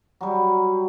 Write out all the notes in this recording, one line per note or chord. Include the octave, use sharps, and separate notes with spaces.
F#3 G3